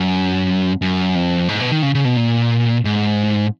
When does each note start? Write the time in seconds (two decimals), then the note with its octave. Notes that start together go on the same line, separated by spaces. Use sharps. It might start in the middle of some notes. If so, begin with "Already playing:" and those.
Already playing: F#2
0.82 F#2
1.15 F2
1.49 G#2
1.60 B2
1.71 D#3
1.82 C#3
1.95 C#3
2.05 B2
2.17 A#2
2.85 G#2